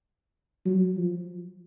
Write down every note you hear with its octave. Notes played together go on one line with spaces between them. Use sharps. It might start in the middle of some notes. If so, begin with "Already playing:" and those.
F#3
F3